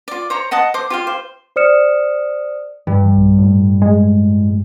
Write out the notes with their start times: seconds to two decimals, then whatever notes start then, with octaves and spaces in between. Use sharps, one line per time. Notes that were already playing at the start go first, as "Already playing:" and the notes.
0.08 F4 D5
0.30 C5 C#5 A#5
0.51 D#5 F#5 A5 D#6
0.74 C5 D6
0.90 F4 G4 F5
1.07 C5
1.56 C5 D5 D#6 F6 C#7 E7
2.87 G2 E3
3.17 B1
3.38 A2
3.82 G#3